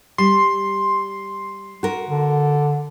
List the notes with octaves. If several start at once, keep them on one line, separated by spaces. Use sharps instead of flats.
G3 C6
F#4 A#4
D3